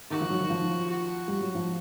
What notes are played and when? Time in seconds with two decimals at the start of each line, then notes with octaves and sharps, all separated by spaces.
0.10 D#3 F#4
0.21 F3
0.30 F#3
0.40 D#3
0.50 F3
0.89 F#4
1.28 G3
1.41 F#3
1.55 F3